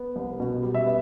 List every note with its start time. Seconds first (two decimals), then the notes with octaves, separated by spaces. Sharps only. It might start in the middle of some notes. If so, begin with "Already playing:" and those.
Already playing: B3
0.16 C2
0.40 B2
0.63 G3
0.74 E5
0.86 B3